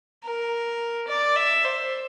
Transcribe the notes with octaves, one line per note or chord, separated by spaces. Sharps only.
A#4
D5
E5
C5